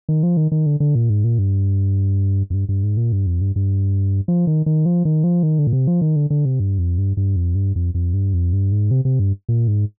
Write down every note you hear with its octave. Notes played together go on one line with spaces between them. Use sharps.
D#3
F3
D#3
D#3
D3
D3
A#2
G#2
A#2
G2
F2
G2
G2
G#2
A#2
G2
F2
G2
G2
F3
D#3
D#3
F3
D#3
F3
D#3
D3
A#2
C3
F3
D#3
D3
D3
C3
G2
F2
G2
G2
F2
G2
F2
F2
G2
F2
G2
G#2
C3
C3
G2
A#2
G#2